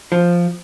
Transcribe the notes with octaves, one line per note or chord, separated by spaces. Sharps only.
F3